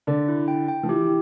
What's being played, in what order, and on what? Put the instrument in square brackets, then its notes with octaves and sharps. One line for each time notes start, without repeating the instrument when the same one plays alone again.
[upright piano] D3 [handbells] D5
[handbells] E4
G5
G5
[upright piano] F3
[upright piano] E3 [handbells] G4